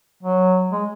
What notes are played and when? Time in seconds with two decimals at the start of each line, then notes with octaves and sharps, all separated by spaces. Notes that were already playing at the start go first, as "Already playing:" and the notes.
0.23 F#3
0.72 G#3